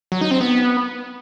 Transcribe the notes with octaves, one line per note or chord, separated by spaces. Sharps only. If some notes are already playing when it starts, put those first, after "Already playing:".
F#3
D#4
C4
B3